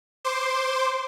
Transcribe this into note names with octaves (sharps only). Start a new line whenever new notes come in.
C5 C6 D6